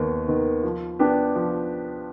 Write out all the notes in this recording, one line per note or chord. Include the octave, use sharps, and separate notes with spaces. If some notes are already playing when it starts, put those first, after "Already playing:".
Already playing: D#2 D#3 B3
D#3 B3
F3
B3 D4 G4
F3